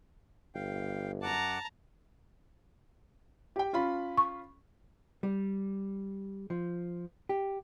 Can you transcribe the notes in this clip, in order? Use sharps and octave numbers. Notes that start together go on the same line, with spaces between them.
G1 F5 G5
F#2 F#5 A5 A#5 D6
G4 G5
C#4 F4 B5
C#6
G3
F3
G4